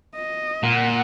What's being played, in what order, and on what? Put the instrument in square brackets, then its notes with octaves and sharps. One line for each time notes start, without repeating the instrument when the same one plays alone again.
[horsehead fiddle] D#5
[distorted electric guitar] A#2 [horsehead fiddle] F#5